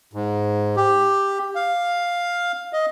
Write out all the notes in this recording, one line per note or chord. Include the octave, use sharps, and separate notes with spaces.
G#2
G4
F5
D#5